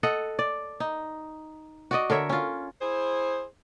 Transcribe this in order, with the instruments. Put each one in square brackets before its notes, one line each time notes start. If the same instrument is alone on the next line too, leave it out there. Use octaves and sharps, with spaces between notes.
[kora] A4 D#5 F#5
D5
D#4
F#4 D5 D#5
D3 A#4 C#5 E5
C#4 F4
[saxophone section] E4 G#4 C5